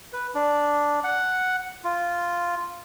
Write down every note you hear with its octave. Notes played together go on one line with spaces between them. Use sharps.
B4
D4
F#5
F4